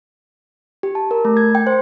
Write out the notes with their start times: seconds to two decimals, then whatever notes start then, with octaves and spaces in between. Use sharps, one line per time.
0.83 G4
0.95 A5
1.11 A#4
1.25 A3
1.37 G#6
1.55 G5
1.67 C5